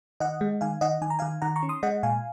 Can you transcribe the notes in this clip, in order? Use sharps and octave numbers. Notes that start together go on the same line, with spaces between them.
D#3 D#5 F#5
G#3
D#3 F5 G#5
D#3 D#5 F#5
D#3 G#5
A#5
D#3 F5 G#5
D#3 F#5 A#5
A#5 C#6
C#4
C6 D#6
G#3 D#5 F#5
A#2 F5 G#5